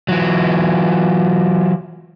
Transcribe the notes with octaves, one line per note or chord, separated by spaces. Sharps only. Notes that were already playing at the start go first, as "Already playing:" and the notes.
E3 F#3